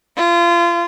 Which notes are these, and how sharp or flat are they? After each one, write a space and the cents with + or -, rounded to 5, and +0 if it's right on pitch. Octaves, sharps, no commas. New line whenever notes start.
F4 -30